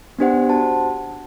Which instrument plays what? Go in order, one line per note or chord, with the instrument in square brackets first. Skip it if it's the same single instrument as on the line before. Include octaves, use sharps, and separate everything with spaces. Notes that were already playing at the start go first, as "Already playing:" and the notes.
[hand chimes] B3 D4 G4 C5 F#5
F#4 C5 F#5 A5